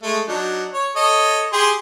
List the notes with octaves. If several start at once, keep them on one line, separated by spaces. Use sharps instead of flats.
G#3 A3
F#3 D4 D#4
C#5
A4 C#5 D#5
G4 G#4 C6